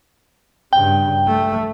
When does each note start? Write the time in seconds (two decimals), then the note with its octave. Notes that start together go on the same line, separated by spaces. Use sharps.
0.73 G2 C#3 G5
1.27 A3